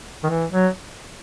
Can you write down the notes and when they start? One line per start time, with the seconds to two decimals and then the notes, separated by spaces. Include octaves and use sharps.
0.24 D#3
0.29 E3
0.52 F#3